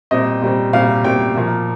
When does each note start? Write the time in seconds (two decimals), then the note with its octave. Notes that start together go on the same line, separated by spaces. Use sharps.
0.11 A#2 G3 C4 D#5
0.42 A#2 G3 C4
0.73 A#2 G3 C4 F5
1.04 A#2 G3 C4 G5
1.36 A#2 F3 A#3